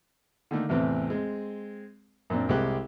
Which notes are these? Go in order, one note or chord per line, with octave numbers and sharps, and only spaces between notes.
D3 D#3 A3 A#3
A1 E2 C3 C4 B4
G#3 C4
F#2 A#2 C4 D4
C2 G#3 C4 G4 F#6